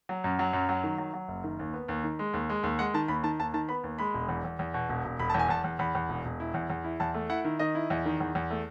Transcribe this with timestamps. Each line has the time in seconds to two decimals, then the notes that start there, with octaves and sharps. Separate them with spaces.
0.09 F#3
0.24 F#2
0.39 F#3
0.53 F#2
0.69 F#3
0.83 D#3
0.98 F#3
1.14 F#3
1.28 F#1
1.44 D#3
1.59 D#2
1.73 B3
1.88 D#2
2.04 D#3
2.19 G#3
2.33 D#2
2.50 G#3
2.63 D#2
2.79 G#3 F#5
2.94 D#3 A5
3.08 D#2 B5
3.23 D#3 A5
3.39 D#2 A5
3.54 D#3 A5
3.69 B3 B5
3.84 D#2
3.99 G#3 B5
4.14 E1
4.29 E2
4.45 E2
4.59 E2
4.74 B2
4.89 E1
5.05 E1
5.19 E1 B5
5.30 E2 A5
5.39 G#5
5.49 E2 A5
5.64 E2
5.79 E2 B5
5.95 E2
6.09 E1
6.25 E1
6.40 E4
6.54 E2
6.70 E2
6.84 E4
7.00 E2 A5
7.14 A3
7.30 E4 F#5
7.44 D#3
7.59 D#3 D#5
7.75 E4
7.90 E2
8.05 D#3
8.20 E2
8.35 E2
8.50 A3